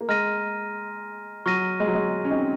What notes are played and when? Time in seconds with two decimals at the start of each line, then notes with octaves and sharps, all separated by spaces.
0.01 A#3
0.09 G#3 A#5 F6 A#6 D#7
1.46 F#3 C#6 F6 A#6 D#7
1.80 G#3
1.87 F#3
1.95 G#3
2.25 C#4
2.31 C4 D#4